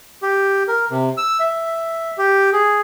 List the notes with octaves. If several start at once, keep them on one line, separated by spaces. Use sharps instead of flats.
G4
A#4
C3
E6
E5
G4
G#4